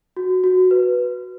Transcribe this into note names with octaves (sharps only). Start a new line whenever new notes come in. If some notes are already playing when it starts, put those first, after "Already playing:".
F#4
F#4
B4